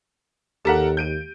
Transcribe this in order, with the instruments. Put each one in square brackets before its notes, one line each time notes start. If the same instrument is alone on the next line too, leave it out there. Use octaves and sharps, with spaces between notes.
[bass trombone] D#2 [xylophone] G4 B6 [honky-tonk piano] A4 A#4 F#5
[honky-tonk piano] G6 D7 D#7